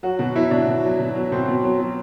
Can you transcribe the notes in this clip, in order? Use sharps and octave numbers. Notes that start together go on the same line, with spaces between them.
F#3 F#4
B2 F#4
F#3 E4
B2 D4
B2
F#3
B2
F#3
B2 C4
B2
F#3
F#3